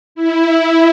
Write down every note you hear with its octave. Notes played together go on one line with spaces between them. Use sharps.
E4